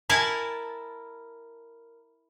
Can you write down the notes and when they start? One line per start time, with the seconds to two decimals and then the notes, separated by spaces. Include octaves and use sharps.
0.10 E4 A#4 G#5 A5